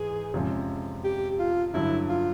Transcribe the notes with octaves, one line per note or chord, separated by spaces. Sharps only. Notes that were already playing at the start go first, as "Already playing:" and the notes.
Already playing: G#2 E3 G#4
F2 C3 F3 G#3 C#4
G4
F4
G2 D3 F#3 E4
F4